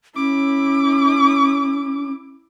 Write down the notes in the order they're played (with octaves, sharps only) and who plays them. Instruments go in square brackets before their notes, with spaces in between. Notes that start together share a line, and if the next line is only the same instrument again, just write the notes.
[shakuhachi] C#4 [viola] E4 D6